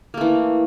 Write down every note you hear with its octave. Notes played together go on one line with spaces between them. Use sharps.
E3 A3 A#3